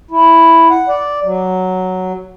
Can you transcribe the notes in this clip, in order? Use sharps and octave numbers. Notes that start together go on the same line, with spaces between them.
E4
F#5
D5
F#3